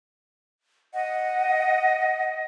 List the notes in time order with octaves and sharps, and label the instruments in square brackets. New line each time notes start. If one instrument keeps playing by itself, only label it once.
[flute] D#5 [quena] F#5